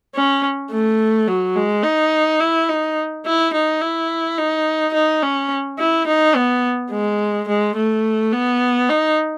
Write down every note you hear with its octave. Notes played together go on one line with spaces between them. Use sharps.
C#4
A3
F#3
G#3
D#4
E4
D#4
E4
D#4
E4
D#4
D#4
C#4
E4
D#4
B3
G#3
G#3
A3
B3
D#4